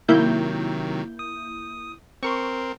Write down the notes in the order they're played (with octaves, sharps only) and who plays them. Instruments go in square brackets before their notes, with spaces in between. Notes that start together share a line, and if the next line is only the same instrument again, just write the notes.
[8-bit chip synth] C3 D#3 F#3 [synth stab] A#3 E4 G6
[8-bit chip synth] D#6
[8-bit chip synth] C4 A#4 C6 [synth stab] C#6